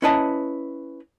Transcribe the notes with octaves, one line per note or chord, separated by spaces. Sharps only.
C#4 E4 B4 D#5 A5